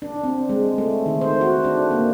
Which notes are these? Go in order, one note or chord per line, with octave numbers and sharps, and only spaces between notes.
D4
C4
G#3
A3
D#3
C5
F#4
D4
A#3